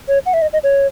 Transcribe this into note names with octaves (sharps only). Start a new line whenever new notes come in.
C#5
F#5
E5
D#5
D#5
C#5